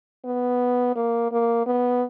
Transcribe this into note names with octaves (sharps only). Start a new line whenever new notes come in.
B3
A#3
A#3
B3